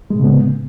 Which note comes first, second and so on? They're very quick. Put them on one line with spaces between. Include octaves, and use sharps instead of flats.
G#3 A2 C#3 B3